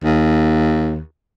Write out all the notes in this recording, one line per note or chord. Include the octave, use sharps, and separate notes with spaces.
D#2